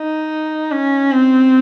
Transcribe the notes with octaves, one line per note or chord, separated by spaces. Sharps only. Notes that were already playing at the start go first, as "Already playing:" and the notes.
Already playing: D#4
C#4
C4